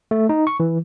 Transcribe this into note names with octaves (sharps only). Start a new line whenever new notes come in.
A3
D#4
C#6
E3